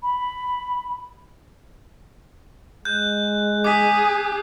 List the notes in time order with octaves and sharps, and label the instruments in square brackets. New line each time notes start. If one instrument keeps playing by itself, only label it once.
[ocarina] B5
[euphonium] G#3 [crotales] F#6 G6
[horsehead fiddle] G#4 [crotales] D6 B6